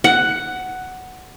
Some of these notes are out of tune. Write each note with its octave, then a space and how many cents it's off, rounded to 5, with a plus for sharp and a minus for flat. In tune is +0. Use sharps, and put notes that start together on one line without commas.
F#5 +5